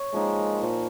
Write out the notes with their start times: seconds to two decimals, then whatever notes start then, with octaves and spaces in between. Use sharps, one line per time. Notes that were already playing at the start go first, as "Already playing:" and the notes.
Already playing: C#5
0.14 F3 G#3 A#3 D#4
0.62 A#2 F3 A#3